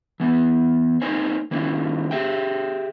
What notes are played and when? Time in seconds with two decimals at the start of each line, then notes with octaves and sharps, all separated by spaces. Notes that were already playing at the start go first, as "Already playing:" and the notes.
0.20 E3 B3
1.02 A#3 C4 D#4 C5 C#5 G#5
1.51 D#3 A#3 C#4 E4
2.11 G4 G#4 E5 G5